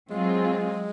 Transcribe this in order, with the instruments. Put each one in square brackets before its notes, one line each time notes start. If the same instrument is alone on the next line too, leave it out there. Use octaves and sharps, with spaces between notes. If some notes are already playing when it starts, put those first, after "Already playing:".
[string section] F#3 C4 F4 G#4 [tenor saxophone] G#3